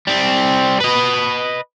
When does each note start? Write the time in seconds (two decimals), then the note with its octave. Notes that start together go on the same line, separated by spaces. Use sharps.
0.07 G3 C4
0.80 B4 D#5